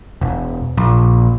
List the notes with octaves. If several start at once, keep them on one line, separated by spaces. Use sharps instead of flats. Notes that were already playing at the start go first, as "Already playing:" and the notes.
E1
A#1